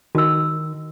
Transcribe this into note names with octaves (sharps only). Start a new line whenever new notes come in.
D#3 F#4 E6